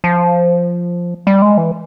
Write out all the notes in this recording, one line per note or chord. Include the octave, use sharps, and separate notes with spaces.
F3
G3
G#3
E3